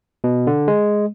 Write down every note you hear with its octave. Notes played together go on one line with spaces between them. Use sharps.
B2
D3
G#3